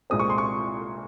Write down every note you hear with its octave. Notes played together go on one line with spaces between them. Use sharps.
C2 A#2 G#3 C4 D#6
C#6
C6
C#6